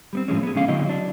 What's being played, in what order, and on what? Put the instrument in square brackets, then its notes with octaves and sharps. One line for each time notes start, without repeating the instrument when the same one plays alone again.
[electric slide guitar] G3 B3 C4
A2 F3 G#3 C#4
B3 G#4
D3 G#3 C#4 F5
D3 F#3 C4 E4 D#5
F#3 D4